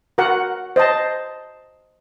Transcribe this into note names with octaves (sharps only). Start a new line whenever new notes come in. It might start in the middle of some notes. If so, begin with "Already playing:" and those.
F#4 A#4 F#5
C5 D#5 A5